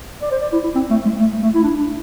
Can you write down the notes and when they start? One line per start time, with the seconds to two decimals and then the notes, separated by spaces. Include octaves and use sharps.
0.22 D5
0.31 C5
0.42 D5
0.53 E4
0.64 E4
0.75 C4
0.90 A3
1.05 G#3
1.20 A3
1.42 A3
1.55 E4
1.63 D4
1.78 D4